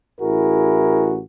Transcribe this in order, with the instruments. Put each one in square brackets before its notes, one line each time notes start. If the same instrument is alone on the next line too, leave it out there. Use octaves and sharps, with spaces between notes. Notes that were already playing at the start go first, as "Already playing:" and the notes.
[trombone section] A1 E4 F#4 G#4 A#4